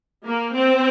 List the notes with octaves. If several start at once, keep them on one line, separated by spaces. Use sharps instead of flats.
A#3
C4